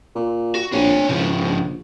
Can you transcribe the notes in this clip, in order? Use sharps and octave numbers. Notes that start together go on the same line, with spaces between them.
A#2
F#4
A#1 D4 C#5
E1 C#3 F3
A#1